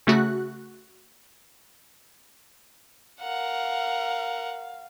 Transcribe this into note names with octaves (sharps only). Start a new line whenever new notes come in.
C#3 A3 F#4 F#6
A#4 F5 F#5